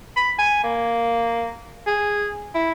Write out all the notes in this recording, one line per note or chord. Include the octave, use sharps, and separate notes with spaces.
B5
G#5
A#3
G#4
E4